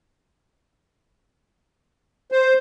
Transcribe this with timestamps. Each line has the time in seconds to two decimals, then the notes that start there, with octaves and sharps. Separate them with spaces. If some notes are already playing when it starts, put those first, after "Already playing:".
2.32 C5